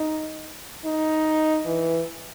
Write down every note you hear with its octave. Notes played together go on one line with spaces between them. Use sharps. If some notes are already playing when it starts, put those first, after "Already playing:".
Already playing: D#4
D#4
E3